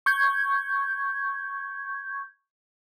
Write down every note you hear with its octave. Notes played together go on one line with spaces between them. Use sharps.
C#6 G6 G#6